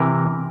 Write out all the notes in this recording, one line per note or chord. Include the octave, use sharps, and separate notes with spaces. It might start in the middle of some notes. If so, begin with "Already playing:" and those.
Already playing: C3 E3 A#4